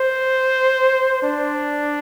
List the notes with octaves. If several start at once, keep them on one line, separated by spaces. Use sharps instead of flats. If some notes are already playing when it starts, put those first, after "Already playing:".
Already playing: C5
D4